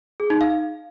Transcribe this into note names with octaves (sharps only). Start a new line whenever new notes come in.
G#4
D#4
F5